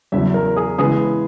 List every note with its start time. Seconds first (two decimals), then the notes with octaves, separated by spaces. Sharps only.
0.12 E2 C#3 F#3 E5
0.34 A#4
0.56 G#4
0.78 C#3 E3 G#3 B3 G#4